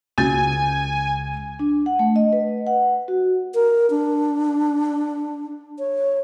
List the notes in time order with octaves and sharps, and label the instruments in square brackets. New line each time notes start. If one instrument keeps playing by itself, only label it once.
[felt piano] C#2 G6 A6 [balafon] C#4 F#4 [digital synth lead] G#5
[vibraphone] D4
F#5
A3
D#5
B4
F#5
F#4
[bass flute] A#4
D4
C#5